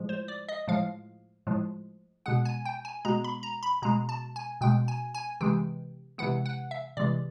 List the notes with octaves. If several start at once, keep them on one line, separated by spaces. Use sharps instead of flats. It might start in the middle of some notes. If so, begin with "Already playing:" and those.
Already playing: A2 F3 G#3
C5
D5
D#5
A2 F3 G#3 F5
A2 F3 G#3
B2 G#3 F#5
G#5
G5
G#5
B2 G#3 A#5
B5
A#5
B5
B2 G#3 A#5
A5
G#5
B2 G#3 G5
G#5
G#5
C3 E3 G#3 G5
C3 E3 G#3 F#5
F#5
E5
C3 E3 G#3 D5